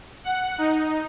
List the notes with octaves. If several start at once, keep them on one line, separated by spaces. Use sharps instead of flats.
F#5
D#4